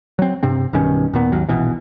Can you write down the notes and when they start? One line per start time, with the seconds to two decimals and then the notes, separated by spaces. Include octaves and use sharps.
0.19 F#3 C4
0.43 G2 C3 C4
0.73 B1 G2 D#3 C#4
1.13 D#2 A#2 B3
1.32 G#1 D#2 F#3
1.49 D#1 A#1 B2 E3